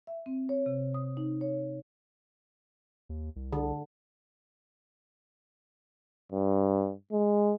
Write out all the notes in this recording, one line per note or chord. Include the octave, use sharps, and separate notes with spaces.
E5
C4
C#5
C3
D#6
D#4
C#5
D#2
C2
D3
G2
G#3